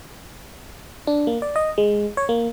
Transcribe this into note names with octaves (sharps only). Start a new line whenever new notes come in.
D4
A#3
D5
D#5
G#3
C#5
A#3